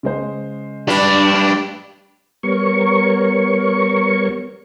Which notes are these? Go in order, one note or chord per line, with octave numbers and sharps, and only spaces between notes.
C#3 G#3 C5
G3 D4 B4
G3 B3 A#4 C#5 C#6